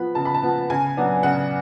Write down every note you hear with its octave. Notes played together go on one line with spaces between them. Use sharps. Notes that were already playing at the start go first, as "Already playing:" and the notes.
Already playing: F3 B3 B5
C#3 A5
B5
A5
F3 B3
C#3 G#5
F#3 B3 D4
C#3 F#5